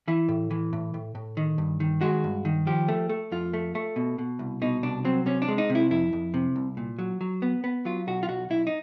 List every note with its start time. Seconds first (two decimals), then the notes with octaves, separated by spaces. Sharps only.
0.08 E3 E4
0.28 A2
0.51 E3
0.73 A2
0.94 A2
1.15 A2
1.37 D#3
1.58 G2
1.80 D#3
2.01 G#3 F#4
2.24 G2
2.45 D#3
2.67 F3 G4
2.88 A3
3.09 A3
3.31 F2 F4
3.53 A3
3.75 A3
3.96 B2
4.18 B2
4.39 C2
4.62 B2 D#4
4.83 C2 D4
5.05 F#3 C4
5.26 C3 C#4
5.42 D4
5.48 G#3
5.58 D#4
5.70 C3
5.75 E4
5.91 F2 E4
6.13 F2
6.34 C3
6.56 C2
6.77 A#2
6.99 F#3
7.21 F#3
7.42 B3
7.64 B3
7.85 F#3 F4
8.07 B1 F#4
8.23 F4
8.29 B1 F#4
8.50 B1 E4
8.67 D#4